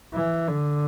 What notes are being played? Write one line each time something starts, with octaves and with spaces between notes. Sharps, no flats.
E3
D3